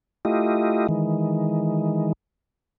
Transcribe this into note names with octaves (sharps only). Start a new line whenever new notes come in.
A3 E4 F4 G4 D#5
D#3 E3 G#3